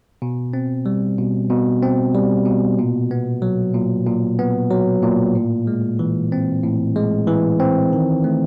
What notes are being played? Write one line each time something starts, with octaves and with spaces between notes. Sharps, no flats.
B2
C4
G3
B2
B2
C4
G3
B2
A#2
B3
F#3
A#2
A#2
B3
F#3
A#2
A2
G#3
E3
C4
A2
G#3
E3
C4
D#3
A3